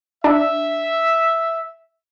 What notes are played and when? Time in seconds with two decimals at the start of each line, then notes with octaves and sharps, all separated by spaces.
0.24 D4 E5